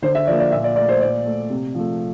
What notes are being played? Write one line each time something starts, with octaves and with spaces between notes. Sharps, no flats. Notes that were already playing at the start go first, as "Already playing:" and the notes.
D3 C5
E5
F3 A#3 D5
D5
A#2 E5
D5
A3 D5
C5
A#2 D5
A3
C3
F3 A3